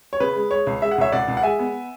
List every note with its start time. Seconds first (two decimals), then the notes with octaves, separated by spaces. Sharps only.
0.13 C#5
0.20 C#3 B4
0.36 G#3
0.51 G#3 C#5
0.67 C#2
0.82 G#3 E5
0.91 F#5
0.98 C#2 C#5 E5
1.12 C#2 D5 F#5
1.28 C#2
1.37 F#5
1.43 G#3 E5 G#5
1.59 B3